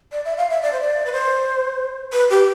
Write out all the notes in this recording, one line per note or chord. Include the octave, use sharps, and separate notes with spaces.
D5
E5
F5
E5
D5
C5
D5
B4
C5
B4
G4